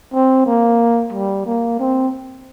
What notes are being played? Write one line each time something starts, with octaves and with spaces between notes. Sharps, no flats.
C4
A#3
G3
A#3
C4